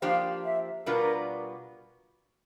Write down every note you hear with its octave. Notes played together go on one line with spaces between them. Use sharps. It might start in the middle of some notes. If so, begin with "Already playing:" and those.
F3 A#3 D4 G4 C5 F5
E5
B2 G3 B3 D4 F4 A#4